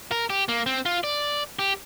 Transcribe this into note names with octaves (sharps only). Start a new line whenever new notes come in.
A#4
G4
A#3
C4
F4
D5
G4